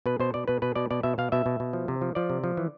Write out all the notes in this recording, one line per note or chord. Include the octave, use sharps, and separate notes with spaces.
B2 B4
B2 C5
B2 D5
B2 B4
B2 B4
B2 D5
B2 D5
B2 E5
B2 F5
B2 E5
B2
B2
F3
C3
F3
F3 D5
C3
F3
E3